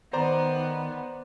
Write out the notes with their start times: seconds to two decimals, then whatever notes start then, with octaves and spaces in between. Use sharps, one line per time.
0.13 D#3 B3 C5 D5 A#5